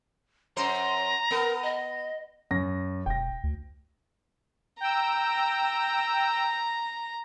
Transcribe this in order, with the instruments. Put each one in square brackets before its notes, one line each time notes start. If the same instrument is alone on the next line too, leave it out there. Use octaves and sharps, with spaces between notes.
[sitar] F#2 C5 [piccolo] A#5 [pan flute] C6
[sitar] B3 [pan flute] A#4
[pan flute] D#5
[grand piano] F#2 A#6
[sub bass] E1 [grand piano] G5 A#6
[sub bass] D2
[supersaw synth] G5 E6 [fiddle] A#5